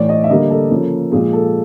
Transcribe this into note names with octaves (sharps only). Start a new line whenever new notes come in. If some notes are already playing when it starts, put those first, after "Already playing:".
Already playing: A2 E3 A3 D5
D#5
E5
D3 G3 A#3 D#5
A4
C#3 F3 A#3
A#2 F3 G#3 G#4
A4